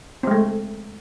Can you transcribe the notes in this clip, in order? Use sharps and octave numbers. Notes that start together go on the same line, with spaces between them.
G#3 A3 C4